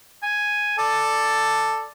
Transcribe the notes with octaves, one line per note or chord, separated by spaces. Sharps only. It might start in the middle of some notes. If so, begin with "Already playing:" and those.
G#5
A4 D5